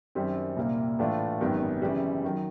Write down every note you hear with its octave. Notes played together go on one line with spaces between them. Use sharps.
F#2 D#3 G3 C4
C2 A#2 G3 A#3
A2 E3 A3 D4 F4
G#1 F#2 D#3 G3 B3
F#2 C#3 E3 G3
D#3 F#3